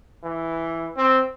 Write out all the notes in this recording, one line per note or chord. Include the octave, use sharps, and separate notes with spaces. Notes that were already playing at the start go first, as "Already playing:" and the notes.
E3
C4